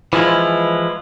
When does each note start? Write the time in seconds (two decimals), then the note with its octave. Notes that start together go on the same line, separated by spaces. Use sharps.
0.13 E3 F3 G#3 E4 F4